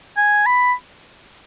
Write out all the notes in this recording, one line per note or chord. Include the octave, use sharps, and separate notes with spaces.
G#5
B5